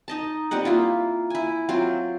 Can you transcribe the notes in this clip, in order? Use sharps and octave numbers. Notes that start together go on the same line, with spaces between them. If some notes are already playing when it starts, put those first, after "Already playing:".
D#4 D#5 A5
G3 C4 D#4 F#5
A#3 E4 F4
E4 G#5
F#3 C4 F4 C5